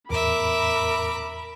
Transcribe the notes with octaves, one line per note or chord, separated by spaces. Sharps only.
E2 A2 A#4 E5 B5 D6